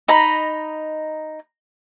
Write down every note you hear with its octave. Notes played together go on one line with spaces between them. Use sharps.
D#4 D#5 A#5 B5